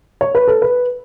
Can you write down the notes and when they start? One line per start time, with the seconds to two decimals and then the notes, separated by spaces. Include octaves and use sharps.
0.21 C#5
0.35 B4
0.48 A4
0.62 B4